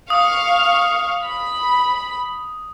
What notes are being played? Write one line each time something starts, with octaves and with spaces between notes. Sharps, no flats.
F5 C#6 D#6
B5